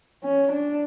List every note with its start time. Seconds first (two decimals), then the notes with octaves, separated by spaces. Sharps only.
0.24 C#4
0.52 D4